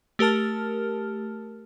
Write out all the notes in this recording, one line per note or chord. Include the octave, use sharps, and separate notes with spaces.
A3 G4 A#4 A5 F6